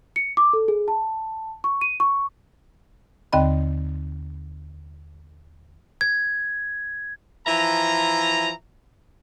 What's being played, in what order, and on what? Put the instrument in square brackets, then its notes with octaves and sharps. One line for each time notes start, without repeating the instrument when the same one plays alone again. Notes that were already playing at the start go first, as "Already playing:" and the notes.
[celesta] C#7
D6
A4
G#4
A5
C#6
D#7
C#6
[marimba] D#2 D3 C4 D#5 B5
[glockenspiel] G#6
[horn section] E3 F3 E5 A#5